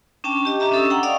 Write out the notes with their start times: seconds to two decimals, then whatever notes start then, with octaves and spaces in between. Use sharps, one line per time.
0.24 C#4 D4 G5 A5
0.45 G4 D#5
0.60 D4 G4 E5 A#5
0.72 C#4 D4 A4 D#6 E6
0.90 F#5 G5 A#5
1.03 D5 D#5 F5 G5 C#6 D#6